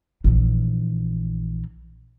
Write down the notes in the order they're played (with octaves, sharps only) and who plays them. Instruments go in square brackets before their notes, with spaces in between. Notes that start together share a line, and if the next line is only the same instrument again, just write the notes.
[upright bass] A#1 E3